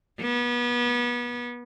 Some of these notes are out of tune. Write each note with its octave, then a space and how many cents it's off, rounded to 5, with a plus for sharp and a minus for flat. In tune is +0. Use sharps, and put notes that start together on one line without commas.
B3 -30